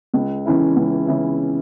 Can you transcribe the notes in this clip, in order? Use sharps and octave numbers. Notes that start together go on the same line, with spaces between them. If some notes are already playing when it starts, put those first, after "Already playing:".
C#2
C#3 E3 C#4 E4
C#2
C#3 E3 C#4 E4